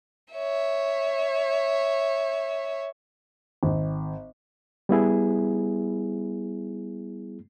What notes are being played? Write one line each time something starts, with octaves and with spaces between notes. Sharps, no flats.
C#5 E5
G#1
G3 B3 E4 G#4